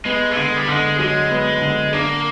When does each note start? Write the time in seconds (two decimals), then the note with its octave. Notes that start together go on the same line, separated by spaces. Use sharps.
0.05 G#3 B3
0.31 A3
0.36 D3 G#3
0.56 G3
0.68 D3 G#3
0.99 F#3 G#3
1.30 B3
1.61 D3
1.93 A#3 D4